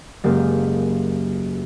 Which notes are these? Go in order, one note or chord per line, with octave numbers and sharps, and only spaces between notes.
F#1 G#3 A#3 G4 A6